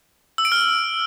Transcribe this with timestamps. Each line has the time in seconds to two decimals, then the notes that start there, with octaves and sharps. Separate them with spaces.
0.38 E6
0.45 D7
0.52 F6